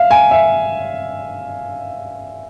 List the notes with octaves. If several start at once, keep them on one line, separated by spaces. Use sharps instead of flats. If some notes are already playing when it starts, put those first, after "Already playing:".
Already playing: E5 F5
G#5
E5